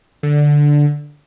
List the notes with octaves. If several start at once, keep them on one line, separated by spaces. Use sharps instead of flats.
D3